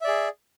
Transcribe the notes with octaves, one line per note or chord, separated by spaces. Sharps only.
G#4 D5 E5